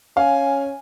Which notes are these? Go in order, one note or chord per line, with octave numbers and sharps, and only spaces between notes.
C#4 F5 G#5